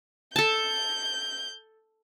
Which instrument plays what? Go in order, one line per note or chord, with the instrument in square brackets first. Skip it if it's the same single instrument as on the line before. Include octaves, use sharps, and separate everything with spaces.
[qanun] A4 A5 [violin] G6